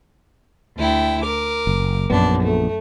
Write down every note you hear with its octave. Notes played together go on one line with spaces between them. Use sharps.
D2 E4 G5
A#4 D6
F#1
A#1 F#2 B3 D4
A3